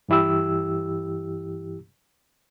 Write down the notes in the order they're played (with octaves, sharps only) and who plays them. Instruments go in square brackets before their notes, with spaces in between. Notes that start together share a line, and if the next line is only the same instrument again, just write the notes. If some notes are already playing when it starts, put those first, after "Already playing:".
[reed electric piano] G2 E3 E4 G4 E6